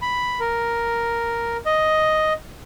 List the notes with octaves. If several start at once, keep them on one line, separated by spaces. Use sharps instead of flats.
B5
A#4
D#5